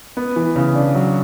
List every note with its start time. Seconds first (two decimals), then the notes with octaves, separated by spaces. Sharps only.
0.17 B3
0.36 E3
0.56 C#3
0.75 D4
0.95 F#3